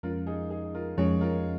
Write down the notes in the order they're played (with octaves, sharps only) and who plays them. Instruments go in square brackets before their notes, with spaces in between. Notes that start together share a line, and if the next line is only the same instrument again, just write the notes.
[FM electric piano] F2 F3 G#3 C#4 [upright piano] F4 A#4
[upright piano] D#4 G#4
D#4 G#4
F4 A#4
[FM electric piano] F2 F3 G#3 C#4 [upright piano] G#4 C#5
[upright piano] F4 A#4